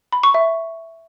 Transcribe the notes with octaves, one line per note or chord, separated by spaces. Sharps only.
B5
C#6
E5